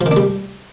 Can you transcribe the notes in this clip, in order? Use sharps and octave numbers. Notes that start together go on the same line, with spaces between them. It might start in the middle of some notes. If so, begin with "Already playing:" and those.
F3
D#3
D4
G3